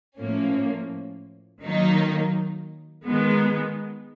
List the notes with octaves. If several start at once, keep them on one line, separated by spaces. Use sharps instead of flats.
A2 F3 A#3 C#4
D#3 F#3 A#3 D#4
D#3 G#3 B3